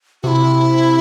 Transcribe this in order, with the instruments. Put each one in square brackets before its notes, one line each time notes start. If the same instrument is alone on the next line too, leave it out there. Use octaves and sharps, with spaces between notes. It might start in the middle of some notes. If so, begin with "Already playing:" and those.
[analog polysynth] C3 [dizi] E4 F#4